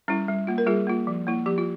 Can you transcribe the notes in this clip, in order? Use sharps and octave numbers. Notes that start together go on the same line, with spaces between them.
G3 C#4 E4
G3
A#3 F4
A#4
G3 F4 G#4
A#3 F4
F3
A#3 E4
F3 G4
F4